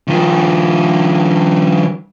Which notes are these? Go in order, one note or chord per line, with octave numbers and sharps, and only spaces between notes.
D#3 F3